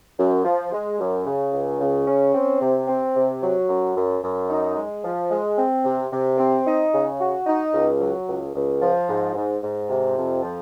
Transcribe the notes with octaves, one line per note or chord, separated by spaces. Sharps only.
F#2
F3
G#3
F#2
C#3
C#2
C#3
C#4
C4
C3
C4
C3
F#3
F#2
F#2
F#2
D#4
G#3
F3
G#3
C4
C3
C3
C4
D#4
C#3
F#4
D#4
C#2
F#3
C#2
C#2
F3
G#2
G#2
G#2
C3
F2
F3